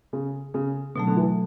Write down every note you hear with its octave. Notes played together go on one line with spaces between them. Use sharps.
C#3
C#3
B2 D3 F#3 A3
D3
E3